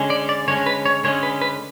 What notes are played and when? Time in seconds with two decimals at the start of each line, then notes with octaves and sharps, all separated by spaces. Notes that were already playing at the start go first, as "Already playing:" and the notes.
Already playing: D3 G#3 C#4
0.10 D5
0.29 D5
0.48 D3 G#3 C#4 C#5
0.66 B4
0.85 C#5
1.04 D3 G#3 C#4 C#5
1.23 B4
1.41 B4